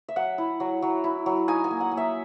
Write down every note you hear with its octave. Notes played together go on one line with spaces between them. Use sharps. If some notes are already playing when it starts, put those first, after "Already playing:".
E5
F#3 F#5
E4
F#3
F#3
E4
F#3
D#4 G#5
G#5
A#3
F#5
A#3
E5